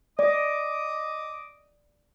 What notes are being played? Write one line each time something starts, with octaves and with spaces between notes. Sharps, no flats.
D5 D#5 D6 D#6